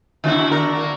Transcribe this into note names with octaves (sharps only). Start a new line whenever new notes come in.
D3 D4 E4 F#4 E5
F#4 A#4 D5
A#3